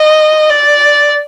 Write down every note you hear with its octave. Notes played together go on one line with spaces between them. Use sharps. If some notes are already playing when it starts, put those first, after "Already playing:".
Already playing: D#5
D5